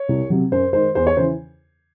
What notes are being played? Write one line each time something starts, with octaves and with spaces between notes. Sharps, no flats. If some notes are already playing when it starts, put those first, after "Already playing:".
Already playing: C#5
C2
C3 F#3
F#2 C5
D#3 G#3 C5
E2 C5
C#5
C#3 E3 C5